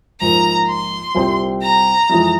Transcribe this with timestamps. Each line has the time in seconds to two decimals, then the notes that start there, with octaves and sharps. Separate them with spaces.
0.20 A#1 G#2 F3 A#3 A#5
0.68 C6
1.15 C2 A#2 G3 C4 G4
1.62 A#5
2.10 F2 E3 G#3